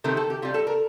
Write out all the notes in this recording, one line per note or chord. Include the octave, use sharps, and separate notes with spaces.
C3 D#3 A3 A#4
A4
G4
C3 G3 F4
A4
A#4